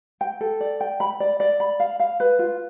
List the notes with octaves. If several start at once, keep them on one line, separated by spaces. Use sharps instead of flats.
G5
A4
D5
G5
B5
D5
D5
B5
F5
F5
B4
F4